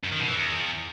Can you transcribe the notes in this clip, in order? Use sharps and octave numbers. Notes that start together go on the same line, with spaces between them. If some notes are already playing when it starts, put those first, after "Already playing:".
F#2
D#3
B2
E3
E2